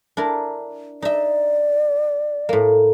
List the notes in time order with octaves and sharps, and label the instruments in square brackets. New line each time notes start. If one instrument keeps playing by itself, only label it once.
[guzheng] D4 E4 A#4
[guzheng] D#4 E5 [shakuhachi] D5
[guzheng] A2 A#3